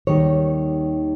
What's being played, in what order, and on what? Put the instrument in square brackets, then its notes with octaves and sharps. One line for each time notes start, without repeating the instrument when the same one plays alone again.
[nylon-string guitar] D#2 D#3 G3 C#5